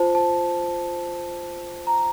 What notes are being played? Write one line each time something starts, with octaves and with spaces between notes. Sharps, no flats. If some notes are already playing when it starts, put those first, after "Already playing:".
Already playing: F4 C5 A5
A5
A#5